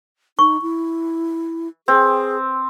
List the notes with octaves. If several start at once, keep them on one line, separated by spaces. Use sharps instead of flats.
D#4 C#6
E4
C4 G#4